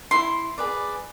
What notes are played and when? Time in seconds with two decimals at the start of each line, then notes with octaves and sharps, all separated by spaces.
0.11 E4 C6
0.58 G#4 B4 D5